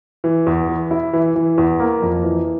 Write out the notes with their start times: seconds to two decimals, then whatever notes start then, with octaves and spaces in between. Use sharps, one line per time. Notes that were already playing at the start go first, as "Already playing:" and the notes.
0.24 E3
0.47 E2
0.69 E3
0.91 E4
1.13 E3
1.36 E3
1.58 E2
1.80 A#3
2.02 F2
2.24 E3